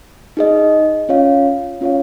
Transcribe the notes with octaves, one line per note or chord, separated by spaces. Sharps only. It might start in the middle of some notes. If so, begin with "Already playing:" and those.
D#4 G#4 D#5
C#4 F4 C#5 F5
C#4 F4 C#5 F5